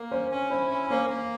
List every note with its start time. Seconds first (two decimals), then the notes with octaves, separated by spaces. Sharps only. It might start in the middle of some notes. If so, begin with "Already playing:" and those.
Already playing: A#3 A#4
0.11 C#4 C5
0.31 C#4
0.50 E4 C5
0.70 C#4
0.90 A#3 C5
1.09 A#3